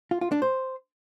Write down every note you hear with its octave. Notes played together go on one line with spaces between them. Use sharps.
F4
F4
D4
C5